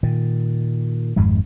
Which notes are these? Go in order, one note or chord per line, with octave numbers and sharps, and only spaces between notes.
A#2 D#3
G#1 F2 G#2 G#3